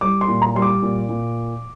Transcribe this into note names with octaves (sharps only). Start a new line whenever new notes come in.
G3 D6
C6
A#2
A#5
G3 C6
D6
A#2
A#2